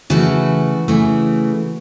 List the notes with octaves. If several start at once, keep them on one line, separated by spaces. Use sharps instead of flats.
C#3 E3 A3 F#4
C#3 E3 A3